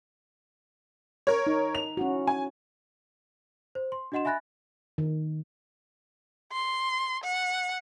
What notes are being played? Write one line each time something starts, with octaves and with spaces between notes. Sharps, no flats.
A#4 C#5
D#4
F7
C#4 E4 F#4
C#4 G#5
C5
C6
D4 F#4 D#5 F#5 C6 E7
E5 G#5 B5 F#6 A6 A#6
D#3
C6
F#5